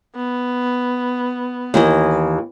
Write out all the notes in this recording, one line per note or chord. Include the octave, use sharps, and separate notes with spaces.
B3
D#2 E3 D#5